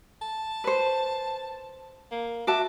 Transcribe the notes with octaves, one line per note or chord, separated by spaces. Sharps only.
A5
B4 C5
A#3
F#4 E5 A5 D6